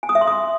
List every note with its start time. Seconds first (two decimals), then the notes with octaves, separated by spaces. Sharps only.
0.03 G#5
0.09 D#6
0.15 E5
0.21 C6
0.27 D#6